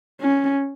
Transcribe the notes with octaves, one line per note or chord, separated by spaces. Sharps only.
C#4